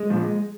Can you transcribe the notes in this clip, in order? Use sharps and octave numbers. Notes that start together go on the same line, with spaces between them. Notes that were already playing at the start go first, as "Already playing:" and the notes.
Already playing: G#3
A#2 F3